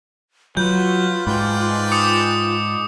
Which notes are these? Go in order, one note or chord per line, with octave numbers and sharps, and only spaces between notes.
F#3 F4 B4 G6
G#2 B4 D5 G5
D6 D#6 C#7